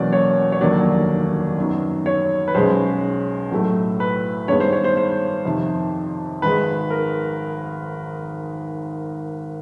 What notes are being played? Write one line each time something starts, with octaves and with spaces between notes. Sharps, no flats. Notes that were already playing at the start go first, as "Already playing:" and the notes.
Already playing: E2 B2 F#3 A#3 C#4 D5
C#5
C#5
F1 D#2 D3 F#3 A#3 D5
F#2 D#3 F#3 B3
C#5
B4
B1 B2 G#3 C#4 C5
B1 A2 F#3 A3
B4
G2 D#3 G#3 B3 C#5
C5
C#5
C5
C5
F2 C3 D#3
G#1 G#2 D#3 G#3 B4
A#4